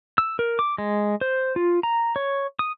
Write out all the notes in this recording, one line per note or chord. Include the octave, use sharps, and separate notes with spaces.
E6
A#4
D6
G#3
C5
F4
A#5
C#5
D#6